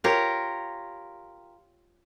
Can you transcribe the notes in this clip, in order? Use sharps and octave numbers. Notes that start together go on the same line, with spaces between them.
F4 G4 A#4 C#5